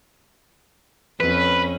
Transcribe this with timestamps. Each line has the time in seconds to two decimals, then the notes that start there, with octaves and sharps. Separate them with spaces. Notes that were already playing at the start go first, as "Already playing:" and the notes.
1.20 F2 C#4 B4